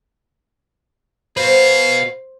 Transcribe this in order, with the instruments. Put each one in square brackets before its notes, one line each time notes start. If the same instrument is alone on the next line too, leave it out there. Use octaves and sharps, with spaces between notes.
[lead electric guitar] F#4 B4 [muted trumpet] G#4 [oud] C5 [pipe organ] F5